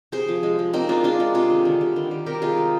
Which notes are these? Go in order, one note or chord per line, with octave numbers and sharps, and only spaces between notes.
C3 G#4 C5
F3
G#3
G#3
A#3 C4 D#4
A#3 D4 F4
G#3 D4 F4
G#3
C3 F4 G#4
D#3
D3
G3
D#3
G3
C3 G4 A#4
D#3 F4 G#4
G#3